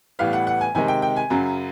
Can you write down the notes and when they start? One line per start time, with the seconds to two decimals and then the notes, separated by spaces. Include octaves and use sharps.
0.19 A2 E3 G3 B3 F5
0.33 F#5
0.47 F#5
0.61 G#5
0.75 C3 D#3 G#3 G#5
0.88 G5
1.02 G5
1.16 G#5
1.30 F#2 C#3 F#3